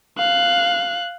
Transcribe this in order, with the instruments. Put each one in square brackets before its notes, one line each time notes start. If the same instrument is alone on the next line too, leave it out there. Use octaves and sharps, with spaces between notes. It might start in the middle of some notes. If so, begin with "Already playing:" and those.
[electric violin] F5 F#6